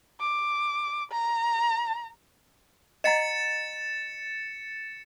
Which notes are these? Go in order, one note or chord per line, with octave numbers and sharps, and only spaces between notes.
D6
A#5
D#5 F#5 A#5 A6 C#7 E7